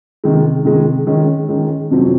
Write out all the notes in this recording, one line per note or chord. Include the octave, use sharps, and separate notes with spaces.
C3 D#3 G#3
C3 D#3 G#3
D#3 G#3 C#4
D#3 G#3 C#4
F2 C3 F#3 C4